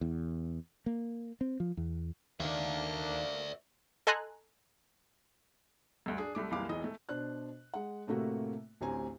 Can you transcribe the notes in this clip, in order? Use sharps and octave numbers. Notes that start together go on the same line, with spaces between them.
E2
A#3
C4
F3
E2
D#2 D#3 A#3 D4 D5 E5
A4 D#5 G#5 A#5 C6 F#6
D2 G2
D4 G#4
C2 A3 D6
F#1 C2 E3 A#3 F5 D6
E1 E3 D#5 D#6
A3
B2 D4 C5 D5 F#6
G#3 F#5
A2 C3 A3 A#3 F#4
A1 D2 C4 G4 G#5 A#5